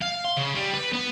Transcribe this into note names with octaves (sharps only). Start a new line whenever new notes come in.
F5
C6
C#3
G3
B4
B3